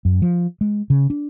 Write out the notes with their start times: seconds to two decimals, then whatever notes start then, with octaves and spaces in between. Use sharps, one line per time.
0.05 F#2
0.22 F3
0.61 G#3
0.90 C#3
1.10 D4